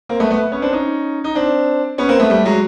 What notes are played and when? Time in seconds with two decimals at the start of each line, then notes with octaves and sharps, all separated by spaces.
0.09 A#3 C4
0.20 A3 B3
0.30 A3 B3
0.52 B3 C#4
0.62 C4 D4
0.72 C#4 D#4
1.24 D#4
1.35 C4 D4
1.98 B3 C#4
2.09 A#3 C4
2.19 A3 B3
2.30 G3 A3
2.45 F#3 G#3